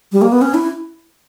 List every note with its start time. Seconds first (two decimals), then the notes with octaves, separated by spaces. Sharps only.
0.12 G3
0.22 A#3
0.32 B3
0.42 C#4
0.54 E4